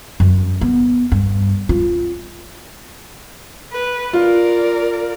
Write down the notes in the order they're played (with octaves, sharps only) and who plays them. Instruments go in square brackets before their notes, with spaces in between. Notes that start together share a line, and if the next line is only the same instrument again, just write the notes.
[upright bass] F#2
B3
G2
F4
[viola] B4
[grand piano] F4 [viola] A#4 D5